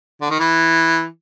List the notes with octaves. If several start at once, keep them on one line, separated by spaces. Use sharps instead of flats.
D3
D#3
E3